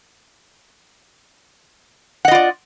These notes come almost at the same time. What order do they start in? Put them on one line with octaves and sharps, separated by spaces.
F#5 D#5 F4 D5